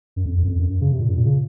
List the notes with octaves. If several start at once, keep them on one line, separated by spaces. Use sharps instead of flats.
F#2
F2
F2
F#2
F2
F#2
F#2
C#3
C3
A#2
F#2
A#2
C#3